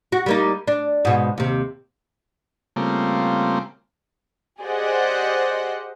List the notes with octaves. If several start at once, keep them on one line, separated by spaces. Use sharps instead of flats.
F#4
G3 A#3 D#4
D4
G#2 B2
D#2 C3
C#3 G3 A3 A#3 C4 F4
G4 G#4 C5 D5 D#5 F#5